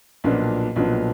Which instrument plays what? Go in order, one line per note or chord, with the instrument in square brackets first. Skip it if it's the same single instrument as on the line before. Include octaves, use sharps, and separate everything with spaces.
[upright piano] B1 A#2 F3 B3 D4
B1 A#2 F3 B3 D4